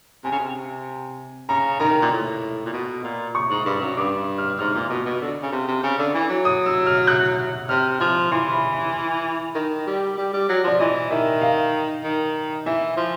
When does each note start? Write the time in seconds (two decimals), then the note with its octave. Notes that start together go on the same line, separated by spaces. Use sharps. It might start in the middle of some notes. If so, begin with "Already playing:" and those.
0.24 C3 G#5
0.32 C#3
0.39 C3
1.48 C#3 A#5
1.80 D#3 A#5
2.02 A#2
2.11 A2
2.66 A#2
2.73 B2
3.04 A#2
3.35 C#6
3.50 G#2
3.66 G2
3.81 F#2
3.97 G2 D6
4.38 F6
4.59 G#2 F6
4.75 A#2
4.90 B2
5.06 B2
5.21 D3
5.43 C#3
5.52 C3
5.68 C3
5.83 C#3
5.99 D3
6.14 E3
6.30 F#3
6.45 D#6
6.66 E6
6.86 F6
7.07 F#6
7.69 C3 F6
8.00 F3 F6
8.31 E3 C6
8.52 B5
8.73 B5
9.55 D#3
9.87 G3
10.18 G3
10.33 G3
10.49 F#3
10.64 F3 D5
10.79 E3 D#5
11.11 D#3 E5
11.41 F5
12.04 D#3
12.66 E3 E5
12.97 F3